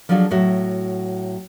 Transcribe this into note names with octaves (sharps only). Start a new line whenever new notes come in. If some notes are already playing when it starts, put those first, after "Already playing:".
F3 F#3 G#3 D4 F4 A4
A2 F#3 F#4 E5